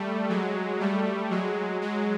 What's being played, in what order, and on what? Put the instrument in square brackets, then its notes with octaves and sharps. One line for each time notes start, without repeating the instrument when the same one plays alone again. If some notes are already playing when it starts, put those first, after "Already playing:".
Already playing: [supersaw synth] G3 A3
F#3 G#3
G3 A3
F#3 G#3
F#3 G#3